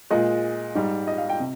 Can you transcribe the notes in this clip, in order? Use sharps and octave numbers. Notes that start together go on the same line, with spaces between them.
A#2 G#3 D#5
G#2 G3
D#5
F5
G5
C3